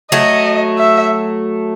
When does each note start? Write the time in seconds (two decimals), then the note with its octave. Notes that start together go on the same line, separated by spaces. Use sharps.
0.12 F#3 A3 D#5
0.78 E5